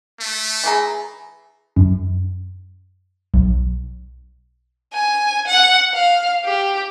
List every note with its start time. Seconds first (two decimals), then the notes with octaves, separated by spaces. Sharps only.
0.20 A3
0.64 E3 G#4 A#5
1.76 F#2
3.34 B1
4.93 G#5
5.47 F#5
5.94 F5
6.44 G4